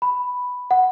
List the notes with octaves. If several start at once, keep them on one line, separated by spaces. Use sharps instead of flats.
B5
F#5